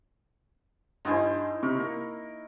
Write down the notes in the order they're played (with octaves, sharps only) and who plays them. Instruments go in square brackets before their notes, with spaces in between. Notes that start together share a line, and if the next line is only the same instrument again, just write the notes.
[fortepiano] G2 G#5 [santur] D#4 E4 C5
[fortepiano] C3 [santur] A#4 C#6
[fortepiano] A#3